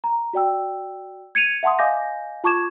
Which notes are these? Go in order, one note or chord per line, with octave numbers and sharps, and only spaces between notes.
A#5
F#4 D5 G5 E6
G#6 C#7 D#7 F7
E5 F#5 A5 C6 D#6
D#5 F5 G#5 D6 G6 A#6
F4 A5 C#6 D6 G#6 E7